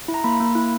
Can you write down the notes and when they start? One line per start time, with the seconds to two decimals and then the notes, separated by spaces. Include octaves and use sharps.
0.08 E4
0.14 A#5
0.24 A#3 B5
0.40 A#3
0.55 E4